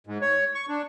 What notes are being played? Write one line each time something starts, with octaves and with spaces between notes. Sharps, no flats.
G#2
C#5
C#6
D4